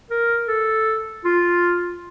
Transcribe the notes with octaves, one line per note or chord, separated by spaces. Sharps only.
A#4
A4
F4